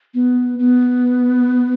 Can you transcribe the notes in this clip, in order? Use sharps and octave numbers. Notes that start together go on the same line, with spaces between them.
B3
B3